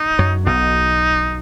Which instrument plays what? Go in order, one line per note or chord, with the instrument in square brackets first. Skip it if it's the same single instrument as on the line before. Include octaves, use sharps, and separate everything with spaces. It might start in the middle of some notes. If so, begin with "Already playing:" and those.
Already playing: [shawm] D#4
[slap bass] F#2 F#3
[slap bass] B1 B2 [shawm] D#4